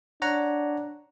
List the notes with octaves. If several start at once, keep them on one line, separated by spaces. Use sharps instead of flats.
D4 C#5 F#5 A#5